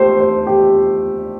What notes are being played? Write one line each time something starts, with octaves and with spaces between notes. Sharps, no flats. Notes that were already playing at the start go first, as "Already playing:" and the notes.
Already playing: A3 G4 C5
C5
G4